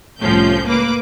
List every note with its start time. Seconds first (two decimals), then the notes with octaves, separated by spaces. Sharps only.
0.21 C2 A2 F3 C#4 G6
0.65 C#2 A#3 B4 D6